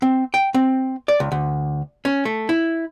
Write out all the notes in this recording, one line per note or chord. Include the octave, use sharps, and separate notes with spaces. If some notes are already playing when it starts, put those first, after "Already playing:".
C4
G5
C4
D5
C#2
D2
C#4
A3
E4